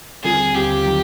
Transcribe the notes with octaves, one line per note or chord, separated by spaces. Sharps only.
D#2 D3 G3 C4 F4 G#4
D#2 D3 G3 C4 F4 G4
D#3 F#3